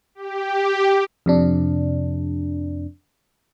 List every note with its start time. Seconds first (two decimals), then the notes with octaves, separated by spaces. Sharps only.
0.15 G4
1.26 F2 C3 D4